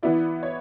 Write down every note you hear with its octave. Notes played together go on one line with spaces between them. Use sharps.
E3 B3 E4 D5
C#5